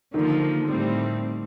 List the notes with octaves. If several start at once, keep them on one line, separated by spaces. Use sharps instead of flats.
D3 D#3 F3 A#3
A2 G3 C4